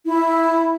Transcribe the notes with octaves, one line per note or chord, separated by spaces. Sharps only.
E4